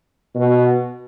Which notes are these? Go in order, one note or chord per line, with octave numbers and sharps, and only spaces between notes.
B2